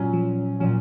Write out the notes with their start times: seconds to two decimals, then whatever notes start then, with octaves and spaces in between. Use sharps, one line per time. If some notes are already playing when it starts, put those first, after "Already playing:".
Already playing: A#2 F#3 C#4
0.13 F3
0.60 A#2 F3 F#3 C#4